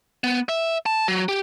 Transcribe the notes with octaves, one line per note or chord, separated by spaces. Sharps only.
B3
E5
A5
F#3
G4